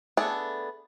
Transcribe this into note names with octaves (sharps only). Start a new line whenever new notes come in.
A3 B3 D4 G#4 A4